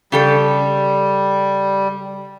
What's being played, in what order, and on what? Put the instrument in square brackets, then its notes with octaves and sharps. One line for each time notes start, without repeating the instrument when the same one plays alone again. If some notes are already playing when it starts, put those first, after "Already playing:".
[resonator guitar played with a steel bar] C#3 G4 A4 [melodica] G3